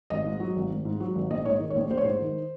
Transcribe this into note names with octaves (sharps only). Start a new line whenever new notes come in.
G#1 D#5
G#2
F#3
G#1
G#1
G#2
F#3
G#1
A#1 D#5
G#2 C#5 D#5
D#3
C#5
A#1
A#1 C5
C#5
G#2 C5
D#3